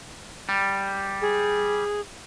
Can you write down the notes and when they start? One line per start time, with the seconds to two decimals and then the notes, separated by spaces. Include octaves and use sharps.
0.49 G3
1.21 G#4